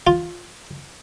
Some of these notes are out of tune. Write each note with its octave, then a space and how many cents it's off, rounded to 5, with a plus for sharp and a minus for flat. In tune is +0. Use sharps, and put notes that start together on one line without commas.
F4 +5